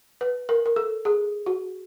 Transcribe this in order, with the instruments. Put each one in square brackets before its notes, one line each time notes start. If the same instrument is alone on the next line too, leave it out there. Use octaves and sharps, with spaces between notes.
[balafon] B4
A#4
A#4
A4
G#4
F#4